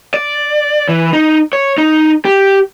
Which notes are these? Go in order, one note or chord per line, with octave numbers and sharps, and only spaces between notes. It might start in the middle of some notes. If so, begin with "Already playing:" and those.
D5
E3
D#4
C#5
D#4
G4